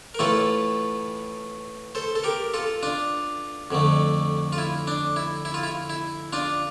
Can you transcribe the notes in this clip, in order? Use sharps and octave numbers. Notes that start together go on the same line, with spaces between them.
A#4
A2 E3 A3 F4 A4
A4 C5
A4
G4 A#4
F4 A4
D4 F4
F2 D3 A3
F4
E4
D4
E4
E4
F4
E4
E4
D4 F4